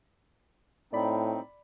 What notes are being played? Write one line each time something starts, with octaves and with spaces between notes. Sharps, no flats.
A2 C4 D#4 D5 B5